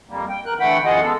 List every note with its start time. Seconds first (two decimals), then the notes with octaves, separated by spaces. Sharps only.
0.09 F2 G3 A#3
0.29 G5
0.46 E2 A#4 F#6
0.60 D3 E3 A3 F#5 G5 B5
0.85 F#2 E3 F4 G#4 D#5 F#5
1.01 G#3 B3 A4